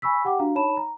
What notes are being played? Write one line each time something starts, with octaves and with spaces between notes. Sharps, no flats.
G#5 B5 C#6 E6 B6
G4 F#5 G5 D6
D4 F#4 F5 A#5
D#4 C#5 A5 B5 E7
A#5